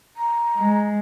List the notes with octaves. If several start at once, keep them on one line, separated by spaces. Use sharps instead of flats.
A#5
G#3